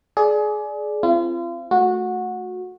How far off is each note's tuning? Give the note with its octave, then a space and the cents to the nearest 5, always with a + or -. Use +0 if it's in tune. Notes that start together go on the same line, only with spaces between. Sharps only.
G#4 +25 D5 +0
C4 +0 F4 -40
A3 -5 F#4 -20